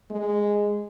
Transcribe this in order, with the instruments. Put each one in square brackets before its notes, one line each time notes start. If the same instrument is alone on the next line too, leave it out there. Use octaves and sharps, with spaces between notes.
[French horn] G#3